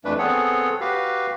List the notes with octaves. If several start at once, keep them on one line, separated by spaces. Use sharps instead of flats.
F2 E3 A3 D4 B4
B3 C4 G#4 A4 C#5 F#5
F#4 G4 B4 F5